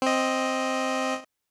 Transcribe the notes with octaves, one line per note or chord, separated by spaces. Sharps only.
C4 D#5